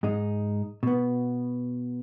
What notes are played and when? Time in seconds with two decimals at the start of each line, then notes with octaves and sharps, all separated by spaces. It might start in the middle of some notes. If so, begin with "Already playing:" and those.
0.03 G#2 G#3 D#4
0.83 B2 B3